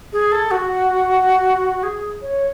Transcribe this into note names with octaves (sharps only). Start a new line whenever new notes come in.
G#4
A4
F#4
G#4
C#5